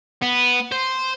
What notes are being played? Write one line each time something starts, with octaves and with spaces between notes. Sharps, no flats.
B3
C5